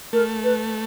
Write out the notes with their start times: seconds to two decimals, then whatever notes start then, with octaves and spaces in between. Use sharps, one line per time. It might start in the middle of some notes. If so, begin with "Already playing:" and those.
0.13 A3 A#4
0.44 B4